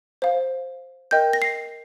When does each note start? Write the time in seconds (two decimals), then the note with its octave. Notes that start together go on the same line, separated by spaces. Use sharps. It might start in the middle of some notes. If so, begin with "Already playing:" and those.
0.22 C5 F5
1.11 A#4 D#5 G5 G6
1.33 A#6
1.42 C7